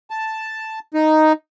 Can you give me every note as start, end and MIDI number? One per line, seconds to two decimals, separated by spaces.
0.10 0.79 81
0.94 1.32 63